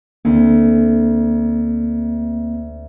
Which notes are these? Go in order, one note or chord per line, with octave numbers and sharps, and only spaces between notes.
D2 A#3 C4